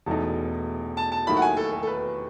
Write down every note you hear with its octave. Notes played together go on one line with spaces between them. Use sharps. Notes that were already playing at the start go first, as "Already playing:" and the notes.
E1 E2 B2 A3 D#4 A5
A5
A5
D#2 D#3 F#3 A3 E4 B5
F#5
G#5
A4
A4
A4
B4